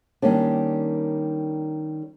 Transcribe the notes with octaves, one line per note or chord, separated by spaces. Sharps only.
D#3 G3 A#3 C#4 D4